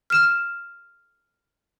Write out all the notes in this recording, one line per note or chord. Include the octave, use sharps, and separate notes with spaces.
F6 E7